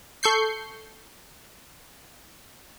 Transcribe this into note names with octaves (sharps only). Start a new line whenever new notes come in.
A4 C#6 G6 C7